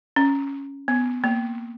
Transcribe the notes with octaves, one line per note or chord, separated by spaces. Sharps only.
C#4
B3
A#3